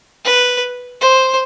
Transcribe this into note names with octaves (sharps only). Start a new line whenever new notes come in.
B4
C5